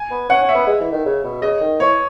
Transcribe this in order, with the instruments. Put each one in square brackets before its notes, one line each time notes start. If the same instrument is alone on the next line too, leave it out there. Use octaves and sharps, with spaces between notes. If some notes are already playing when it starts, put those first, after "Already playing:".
Already playing: [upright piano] G#5
[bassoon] B3
[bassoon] C#4 [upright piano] F#5
[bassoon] C#4
[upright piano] E5
[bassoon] B3
G#3
E3
D#3
C#3
B2
[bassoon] C#3 [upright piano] D#5
[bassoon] D#3
[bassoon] E3 [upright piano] C#5